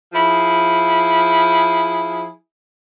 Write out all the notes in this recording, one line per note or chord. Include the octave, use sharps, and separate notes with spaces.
F3 E4 G#4